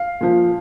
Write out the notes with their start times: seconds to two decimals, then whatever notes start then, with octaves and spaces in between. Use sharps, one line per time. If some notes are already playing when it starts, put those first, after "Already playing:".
Already playing: F5
0.21 A#2 F3